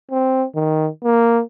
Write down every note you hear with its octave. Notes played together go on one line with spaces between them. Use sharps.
C4
D#3
A#3